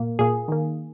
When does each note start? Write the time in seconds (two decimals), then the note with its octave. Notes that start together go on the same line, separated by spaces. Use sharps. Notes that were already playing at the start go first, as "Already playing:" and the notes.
Already playing: A#2 A#3
0.19 A#2 A#3 G#4
0.48 D#3 A#3